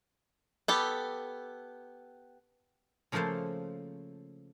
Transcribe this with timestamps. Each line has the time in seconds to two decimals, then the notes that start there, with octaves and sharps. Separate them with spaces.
0.68 B3 G4 A4
3.12 C#3 F3 A3 A#3 A4 C5